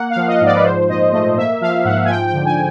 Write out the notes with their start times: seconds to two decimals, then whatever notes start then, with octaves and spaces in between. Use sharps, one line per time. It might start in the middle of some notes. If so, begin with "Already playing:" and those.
Already playing: A#3 F#5
0.10 F5
0.16 F3
0.28 D#5
0.41 G#2 D5
0.55 B4
0.64 F3 C5
0.89 A#2 D#5
1.13 A3 D#5
1.37 A#3 E5
1.61 F3 F5
1.85 G#2 F#5
2.05 G#5
2.09 F3 G5
2.27 G5
2.33 D3
2.45 G#5